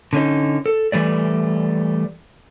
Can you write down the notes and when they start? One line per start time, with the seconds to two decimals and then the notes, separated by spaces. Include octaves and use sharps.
0.13 D3 C#4 D#4
0.66 A4
0.92 E3 G3 A3 D5